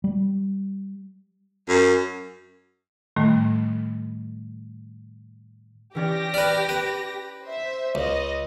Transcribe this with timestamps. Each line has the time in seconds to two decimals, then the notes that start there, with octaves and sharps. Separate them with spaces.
0.04 G3
1.68 F#2
3.16 A2 D#3 G3 A3
5.95 E3 C#4 G4 D5 A#6
6.34 B4 D5 F6
6.69 B4
7.42 C5 E5
7.95 C#2 D#5